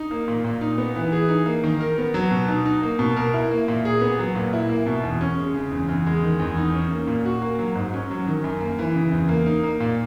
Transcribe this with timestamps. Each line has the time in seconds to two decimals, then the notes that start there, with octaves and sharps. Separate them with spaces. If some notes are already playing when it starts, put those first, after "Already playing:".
Already playing: D#4
0.11 A#3
0.28 A#2
0.45 A#2
0.61 D#4
0.78 B3
0.95 E3
1.12 G#4
1.29 D#4
1.46 A#3
1.64 D#3
1.80 A#4
1.98 B3
2.14 F#3
2.31 B2
2.48 D#4
2.66 D#4
2.83 A#3
2.99 B2
3.17 A#4
3.34 E4
3.51 A#3
3.68 A#2
3.85 G#4
4.01 B3
4.19 F#3
4.35 A#2
4.53 E4
4.69 A#3
4.87 B2
5.04 E2
5.21 C#4
5.38 G#3
5.54 C#3
5.71 E2
5.89 E2
6.06 G#3
6.23 D#3
6.39 E2
6.57 D#4
6.74 C#4
6.90 A#3
7.07 A#2
7.25 F#4
7.42 A#3
7.59 F#3
7.76 G#2
7.94 C#4
8.11 F#3
8.27 D#3
8.44 F#2
8.61 A#3
8.79 E3
8.95 C#3
9.12 E2
9.29 A#3
9.46 D#4
9.63 A#3
9.80 A#2